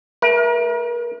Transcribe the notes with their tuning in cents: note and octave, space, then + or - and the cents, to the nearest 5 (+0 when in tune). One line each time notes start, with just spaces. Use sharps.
A3 +0 A#4 +40